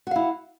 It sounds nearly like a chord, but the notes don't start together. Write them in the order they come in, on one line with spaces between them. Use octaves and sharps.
F#4 F5 E4